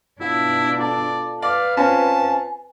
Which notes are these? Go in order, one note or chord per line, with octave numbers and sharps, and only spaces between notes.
B2 D4 E4 F4
F4 A4 D5
B4 D5 F5
C4 C#4 F4 G#5 A5